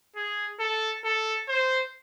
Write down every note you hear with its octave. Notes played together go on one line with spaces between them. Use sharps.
G#4
A4
A4
C5